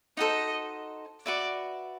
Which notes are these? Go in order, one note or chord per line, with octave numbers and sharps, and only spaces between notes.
D#4 F#4 A4 C5 D#5
F#4 B4 D5 E5